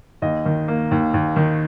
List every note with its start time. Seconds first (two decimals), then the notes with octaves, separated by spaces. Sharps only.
0.22 D#2 D#5
0.46 D#3
0.68 A#3
0.91 D#2
1.14 D#2
1.36 D#3